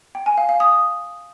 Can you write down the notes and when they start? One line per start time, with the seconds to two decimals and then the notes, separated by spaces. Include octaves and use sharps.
0.15 G5
0.26 G#5
0.38 F5
0.49 F5
0.60 D#6